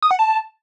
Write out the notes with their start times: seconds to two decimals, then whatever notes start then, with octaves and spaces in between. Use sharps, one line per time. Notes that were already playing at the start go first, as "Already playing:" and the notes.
0.02 D#6
0.11 F#5
0.19 A5